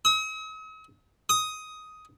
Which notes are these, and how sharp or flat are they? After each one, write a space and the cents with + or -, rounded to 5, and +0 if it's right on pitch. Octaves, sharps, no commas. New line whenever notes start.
D#6 +45
D#6 +10